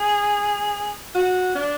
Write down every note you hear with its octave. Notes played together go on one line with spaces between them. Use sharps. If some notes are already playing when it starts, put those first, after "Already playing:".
Already playing: G#4
F#4
D4